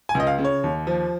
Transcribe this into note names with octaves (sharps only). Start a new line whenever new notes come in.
G#5
C#2
D#5
F5
C#3
C#5
D#2
F3